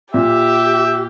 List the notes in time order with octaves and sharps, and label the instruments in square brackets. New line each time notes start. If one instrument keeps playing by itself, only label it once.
[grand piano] A#2 [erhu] G4 [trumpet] E5